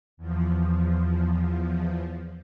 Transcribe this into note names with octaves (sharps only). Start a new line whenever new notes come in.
E2 F3